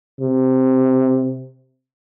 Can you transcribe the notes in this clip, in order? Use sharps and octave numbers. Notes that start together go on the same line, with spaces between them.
C3